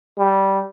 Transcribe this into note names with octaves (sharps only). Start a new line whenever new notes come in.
G3